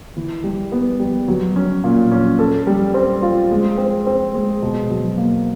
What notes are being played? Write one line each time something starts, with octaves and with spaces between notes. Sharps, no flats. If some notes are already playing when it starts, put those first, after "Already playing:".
E3
G3
B3
G3
F#3
C#4
A#2
C#4
A4
G3
C4
F4
G#3
C4
C4
G#3
B2
F#3
A#3